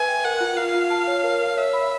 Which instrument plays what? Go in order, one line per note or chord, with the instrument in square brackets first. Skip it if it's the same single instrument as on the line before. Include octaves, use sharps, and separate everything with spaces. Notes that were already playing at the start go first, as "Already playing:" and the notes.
Already playing: [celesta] B4 E5 [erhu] G#5
[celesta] G5
[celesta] A#4 [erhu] F#5
[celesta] F4
[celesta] F4 [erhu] F5
[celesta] F4
A5
C#5
A#4
A#4
[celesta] C#5 [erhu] E5
[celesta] B5